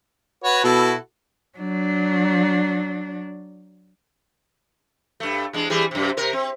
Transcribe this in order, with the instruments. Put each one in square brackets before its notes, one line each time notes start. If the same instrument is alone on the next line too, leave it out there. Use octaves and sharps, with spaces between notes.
[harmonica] F#4 B4 C#5
[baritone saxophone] B2 [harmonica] E4 F#4 A4
[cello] F#3 D4
[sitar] G2 A3
E2 G#3 D4
E3 G3 G#4
F#2 C3
C3 A#4
C4